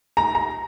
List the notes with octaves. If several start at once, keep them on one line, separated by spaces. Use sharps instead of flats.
A#5
A#5